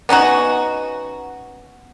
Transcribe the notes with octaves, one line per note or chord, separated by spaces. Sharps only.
B3 C#4 D#4 F#4